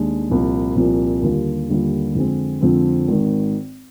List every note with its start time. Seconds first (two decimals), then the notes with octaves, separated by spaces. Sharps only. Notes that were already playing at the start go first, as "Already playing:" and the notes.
Already playing: D#2 D#3 G#3 D4
0.29 C2 A#2 F3
0.76 C2 A#2 F3
1.22 D#2 D3 G3 A#3 F4
1.70 D#2 D3 G3 A#3 F4
2.15 F2 D3 F3 G#3 C4
2.61 F2 D3 F3 G#3 C4
3.08 G#1 G#2 D#3